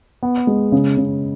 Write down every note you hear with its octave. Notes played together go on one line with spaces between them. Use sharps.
B3
G#3
C#3
C#3